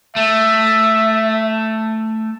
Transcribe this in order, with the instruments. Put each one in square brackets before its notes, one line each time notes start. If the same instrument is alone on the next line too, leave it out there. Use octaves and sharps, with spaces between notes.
[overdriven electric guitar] A3 [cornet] E5